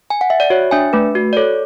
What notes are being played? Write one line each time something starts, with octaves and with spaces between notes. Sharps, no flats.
G#5
F#5
E5
D5
F#4 C#5
D4 E5 G#5
A3 B4
F#4
D5
A4 C#5